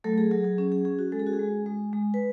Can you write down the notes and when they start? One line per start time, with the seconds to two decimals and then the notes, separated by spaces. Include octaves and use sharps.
0.04 F#3 A3 A4
0.18 G#4
0.31 F#3 G#4
0.44 G#4
0.58 C#4 G#4
0.72 G#4
0.85 C#4 G#4
0.99 F#4
1.12 G#3 A4
1.19 G#4
1.26 F#4
1.33 G#4
1.39 G#3
1.66 G#3
1.93 G#3
2.14 B4